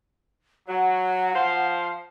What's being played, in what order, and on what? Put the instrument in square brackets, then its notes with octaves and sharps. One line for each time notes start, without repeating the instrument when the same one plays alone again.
[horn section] F#3 [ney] F#5
[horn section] F3 C5 F5